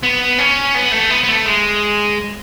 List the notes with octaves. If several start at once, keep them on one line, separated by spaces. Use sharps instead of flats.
B3
C#4
B3
A3
B3
B3
A3
G#3